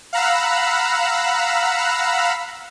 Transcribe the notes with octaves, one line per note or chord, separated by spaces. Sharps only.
F5 F#5 A#5 B5 E6 F#6